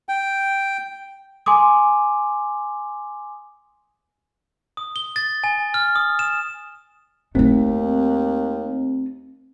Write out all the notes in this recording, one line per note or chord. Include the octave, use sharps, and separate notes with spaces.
G5
G#5 C6 D6 D#6
D#6
G7
A6
G#5
F6
D#6
E7
D#2 A3 C4 D#4